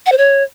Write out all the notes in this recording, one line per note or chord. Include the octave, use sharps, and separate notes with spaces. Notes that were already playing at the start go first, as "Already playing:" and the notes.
F#5
C5
C#5